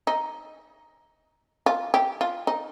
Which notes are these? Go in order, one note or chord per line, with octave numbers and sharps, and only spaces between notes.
D#4
F4
G4
F4
D#4